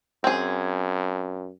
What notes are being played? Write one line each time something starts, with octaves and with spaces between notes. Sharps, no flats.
F#2 C4 G#4